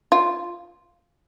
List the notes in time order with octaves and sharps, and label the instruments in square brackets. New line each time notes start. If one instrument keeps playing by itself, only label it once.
[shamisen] F4